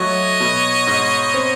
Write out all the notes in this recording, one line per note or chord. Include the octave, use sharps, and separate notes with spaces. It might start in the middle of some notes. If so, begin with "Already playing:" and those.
Already playing: F#3 A3 C#5 D#5
B2
G#2
C4